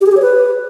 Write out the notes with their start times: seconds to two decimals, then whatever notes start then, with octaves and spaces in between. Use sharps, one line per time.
0.01 G4
0.06 G#4
0.11 G4
0.17 C#5
0.22 B4